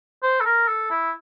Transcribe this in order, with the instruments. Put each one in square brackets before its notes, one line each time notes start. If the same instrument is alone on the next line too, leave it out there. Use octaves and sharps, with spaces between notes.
[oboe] C5
A4
A#4
A4
E4